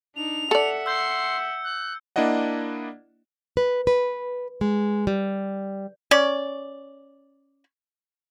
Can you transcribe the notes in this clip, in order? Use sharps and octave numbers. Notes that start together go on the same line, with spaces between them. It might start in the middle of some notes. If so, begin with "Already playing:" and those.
D4 D#4 F7
A4 D5 E5 F#5 C#7
C6 E6 G6
F#6
A#3 D4 E4 D5 D#5 F#5
B4
B4
G#3
G3
C#4 D5